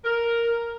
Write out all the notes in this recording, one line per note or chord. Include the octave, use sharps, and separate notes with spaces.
A#4